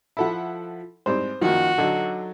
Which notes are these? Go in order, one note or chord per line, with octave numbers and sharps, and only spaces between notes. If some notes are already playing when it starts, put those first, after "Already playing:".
F3 E4 A4 E5 F#5 B5
G#2 G3 C4 C5
F#2 D#3 F3 F#3 A#3 F#4
D3 F#3 D#4 A4